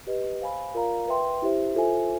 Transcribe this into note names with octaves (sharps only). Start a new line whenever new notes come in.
G4 B4 D#5
C5 F5 G#5 B5
F4 A#4 D5 F5 A#5
B4 E5 G5 C6
E4 G4 C5 E5
F4 A4 C5 E5 G#5